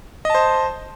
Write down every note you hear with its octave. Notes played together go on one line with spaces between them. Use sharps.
C5 D#5 A5